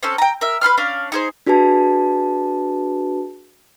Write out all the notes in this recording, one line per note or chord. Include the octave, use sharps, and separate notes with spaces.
C4 C#4 A4
G5 A#5
A#4 E5
B4 B5 C6 F6
C#4 D4 F5
D#4 G#4 C5
D4 F#4 G#4 B4 A5